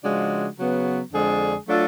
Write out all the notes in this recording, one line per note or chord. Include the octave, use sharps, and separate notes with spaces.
C#3 F3 G#3 D4 F#4
C#3 F#3 B3
F2 D3 G#3 D4 G#4
F#3 A3 D4 F4 A4